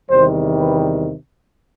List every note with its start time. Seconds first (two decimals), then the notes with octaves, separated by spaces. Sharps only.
0.10 E2 C3 D#3 G3 C5
0.61 B4